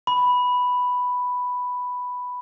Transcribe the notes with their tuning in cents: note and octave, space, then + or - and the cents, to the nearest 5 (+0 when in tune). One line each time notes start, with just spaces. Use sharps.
B5 +0